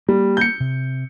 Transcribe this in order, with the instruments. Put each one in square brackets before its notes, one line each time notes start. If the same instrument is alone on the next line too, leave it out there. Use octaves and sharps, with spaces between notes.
[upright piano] G3 [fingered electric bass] A#3
[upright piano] G6 C#7
[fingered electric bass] C3